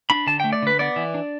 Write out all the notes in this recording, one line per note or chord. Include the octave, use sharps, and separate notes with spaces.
D4 B5
D3 A5
A3 G5
D5
D3 B4
B3 D5
E3
D4